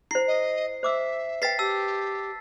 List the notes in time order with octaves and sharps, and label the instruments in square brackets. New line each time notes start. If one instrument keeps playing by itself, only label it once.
[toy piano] E4 C5 [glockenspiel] C7
[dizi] D#5
[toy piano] C5 D6 E6 [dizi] E5
[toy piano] B4 E5 G5 [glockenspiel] A6 B6 C7
[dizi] G4 [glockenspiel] A5 E6